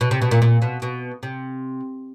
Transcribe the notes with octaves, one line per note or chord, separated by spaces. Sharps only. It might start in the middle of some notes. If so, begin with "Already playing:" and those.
B2
C3
B2
A#2
A#2
B2
B2
C3